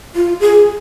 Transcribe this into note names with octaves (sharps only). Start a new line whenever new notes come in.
F4
G#4